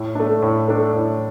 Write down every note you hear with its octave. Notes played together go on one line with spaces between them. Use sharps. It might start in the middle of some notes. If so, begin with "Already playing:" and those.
Already playing: A2
A3 D4
A2
A3 D4
A2